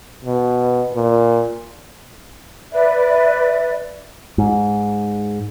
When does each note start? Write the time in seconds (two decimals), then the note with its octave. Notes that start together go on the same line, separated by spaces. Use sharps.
0.24 B2
0.94 A#2
2.72 B4 D5 E5
4.38 G#2